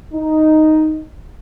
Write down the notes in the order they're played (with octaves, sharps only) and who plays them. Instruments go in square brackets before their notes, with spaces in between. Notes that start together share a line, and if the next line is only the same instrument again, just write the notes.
[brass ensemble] D#4